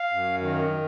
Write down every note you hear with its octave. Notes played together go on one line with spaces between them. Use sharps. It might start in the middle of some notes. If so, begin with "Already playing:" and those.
Already playing: F5
F#2
D#3